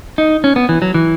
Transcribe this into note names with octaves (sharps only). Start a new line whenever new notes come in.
D#4
C#4
B3
E3
F#3
E3